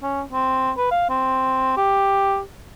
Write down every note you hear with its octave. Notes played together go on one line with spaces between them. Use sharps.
C#4
C4
B4
F5
C4
G4